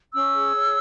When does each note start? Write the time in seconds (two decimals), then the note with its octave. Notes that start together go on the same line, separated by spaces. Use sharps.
0.13 C#4 E6
0.34 G#4
0.54 C#5